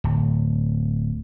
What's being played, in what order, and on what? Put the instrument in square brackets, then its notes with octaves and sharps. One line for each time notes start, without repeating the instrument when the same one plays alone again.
[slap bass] D1